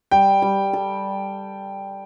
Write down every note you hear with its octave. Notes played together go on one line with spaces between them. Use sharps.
G3 G5
G3
A4